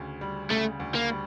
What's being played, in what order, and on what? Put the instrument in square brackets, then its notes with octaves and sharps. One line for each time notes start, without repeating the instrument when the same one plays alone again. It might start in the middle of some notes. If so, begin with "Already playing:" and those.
Already playing: [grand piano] D2 C#3
G3
[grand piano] C#3 [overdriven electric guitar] A3
[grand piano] D2
[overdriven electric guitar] A#3
[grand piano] G3